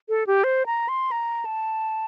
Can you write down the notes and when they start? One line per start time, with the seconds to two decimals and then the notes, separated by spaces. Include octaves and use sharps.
0.09 A4
0.27 G4
0.44 C5
0.66 A#5
0.89 C6
1.12 A#5
1.45 A5